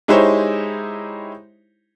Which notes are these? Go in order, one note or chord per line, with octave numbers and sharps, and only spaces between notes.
G#3 D#4 E4 G4 C5 C#5